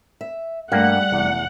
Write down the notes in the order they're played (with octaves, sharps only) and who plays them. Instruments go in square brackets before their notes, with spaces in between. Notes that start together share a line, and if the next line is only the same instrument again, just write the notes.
[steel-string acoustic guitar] E5
[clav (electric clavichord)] G2 A#3 [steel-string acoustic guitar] G3 [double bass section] A3 [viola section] F#5
[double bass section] F1 [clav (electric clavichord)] E2